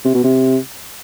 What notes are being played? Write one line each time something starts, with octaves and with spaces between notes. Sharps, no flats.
C3
B2
C3